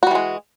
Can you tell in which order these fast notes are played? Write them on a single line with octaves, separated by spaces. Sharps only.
F#4 G3 E3 G#3